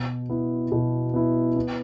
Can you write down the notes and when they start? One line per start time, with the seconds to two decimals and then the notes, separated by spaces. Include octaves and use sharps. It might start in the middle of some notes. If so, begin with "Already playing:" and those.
Already playing: B2
0.29 B3 E4
0.72 B2
1.14 B3 E4
1.56 B3